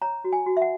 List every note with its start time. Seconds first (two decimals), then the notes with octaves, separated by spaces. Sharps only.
0.02 C#5 A#5
0.24 F#4
0.33 G#5
0.46 F#4
0.57 E5
0.62 F#5